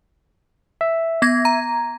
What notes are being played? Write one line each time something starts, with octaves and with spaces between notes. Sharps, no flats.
E5
B3 G#6 A#6
A#5